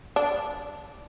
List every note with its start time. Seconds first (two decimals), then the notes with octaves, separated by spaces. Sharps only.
0.16 D4